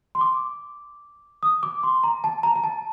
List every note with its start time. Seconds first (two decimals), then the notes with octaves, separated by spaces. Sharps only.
0.15 C6
0.21 D6
1.43 D#6
1.63 D6
1.83 C6
2.03 A#5
2.24 A5
2.43 A#5
2.56 A#5
2.64 A5